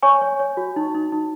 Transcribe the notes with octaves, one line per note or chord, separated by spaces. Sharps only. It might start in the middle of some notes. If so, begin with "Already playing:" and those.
C#5 G#5 C#6
C#5
C#5
F#4
D#4
D#4
D#4